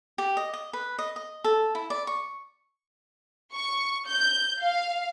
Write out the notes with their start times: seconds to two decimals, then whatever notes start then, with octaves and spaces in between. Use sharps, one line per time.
0.18 G4
0.37 D#5
0.54 D#5
0.73 B4
0.99 D#5
1.16 D#5
1.44 A4
1.75 E4
1.90 D5
2.07 C#6
3.53 C#6
4.08 G6
4.60 F5